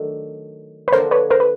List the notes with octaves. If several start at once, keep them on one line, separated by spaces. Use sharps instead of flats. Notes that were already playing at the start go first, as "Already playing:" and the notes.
Already playing: D#3 F#3 A3 D4
B4
D3 F3 A#3 D4 F#4 A#4 C5
B4 C#5
A#4 C5
B4